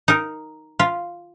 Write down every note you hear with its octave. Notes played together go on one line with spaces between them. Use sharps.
D#4 A#4
F4